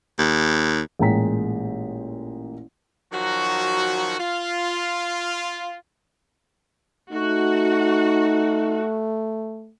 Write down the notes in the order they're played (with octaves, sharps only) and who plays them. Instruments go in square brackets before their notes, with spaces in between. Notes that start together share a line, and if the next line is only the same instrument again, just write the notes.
[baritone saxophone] D#2
[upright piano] A1 A#2 G#3 G5 A#5 B6
[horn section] D#3 F3 F#3 F#4
F4
[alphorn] A3 [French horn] D#4 [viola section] F#4